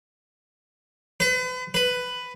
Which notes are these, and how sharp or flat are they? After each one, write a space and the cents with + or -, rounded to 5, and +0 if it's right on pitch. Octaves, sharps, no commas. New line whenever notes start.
B4 +40
B4 +10